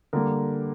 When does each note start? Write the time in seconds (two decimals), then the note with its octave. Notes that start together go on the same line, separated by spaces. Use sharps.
0.13 D3 G3 A#3 A#4